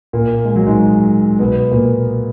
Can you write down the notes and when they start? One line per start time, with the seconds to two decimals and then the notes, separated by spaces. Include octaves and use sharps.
0.13 A#2 A#3
0.45 G#3
0.56 F#3
0.67 G#2 G#3
1.39 B2 B3
1.71 A#2 A#3